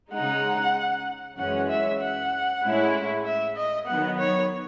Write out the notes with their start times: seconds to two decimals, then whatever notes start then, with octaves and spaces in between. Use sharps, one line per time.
0.13 C#3 G#3 D#4 F#5
1.38 F#2 E3 G#3 C#4 F#5
1.70 E5
2.01 F#5
2.63 A2 G#3 C#4 E4
3.26 E5
3.57 D#5
3.87 D#3 F#3 B3 F#5
4.19 C#5